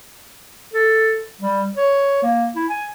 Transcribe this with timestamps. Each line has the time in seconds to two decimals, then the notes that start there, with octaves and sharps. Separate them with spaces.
0.74 A4
1.41 G3
1.77 C#5
2.23 A#3
2.55 E4
2.69 G#5